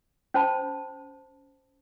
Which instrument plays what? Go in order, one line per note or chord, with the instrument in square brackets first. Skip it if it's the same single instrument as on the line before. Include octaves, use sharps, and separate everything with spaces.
[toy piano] C#4 C5 A5 B5